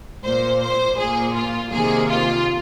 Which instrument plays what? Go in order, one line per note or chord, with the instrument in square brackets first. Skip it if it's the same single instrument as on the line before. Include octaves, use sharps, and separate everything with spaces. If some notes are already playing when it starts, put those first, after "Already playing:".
[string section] A#2 A#3 C5
C5
A#2 A#3 G#4
F4
C3 D#3 A#3 G#4
F4